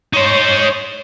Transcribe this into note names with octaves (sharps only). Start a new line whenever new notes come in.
D#4 C5 C#5